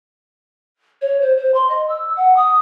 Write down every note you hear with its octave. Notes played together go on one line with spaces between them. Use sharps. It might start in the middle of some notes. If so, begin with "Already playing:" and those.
C#5
C5
C5
C6
D#5
E6
F#5
D#6